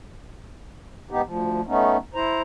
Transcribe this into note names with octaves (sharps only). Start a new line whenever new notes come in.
G#2 B3 D#4 G4
D2 F3
A3 B3 C#4 D#4
E4 C5 A#5